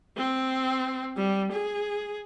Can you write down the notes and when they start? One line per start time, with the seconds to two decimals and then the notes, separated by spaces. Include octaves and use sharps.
0.17 C4
1.16 G3
1.52 G#4